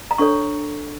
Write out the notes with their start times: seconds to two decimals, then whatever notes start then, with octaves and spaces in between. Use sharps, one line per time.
0.11 A#5
0.18 D4 A4 C#5 C#6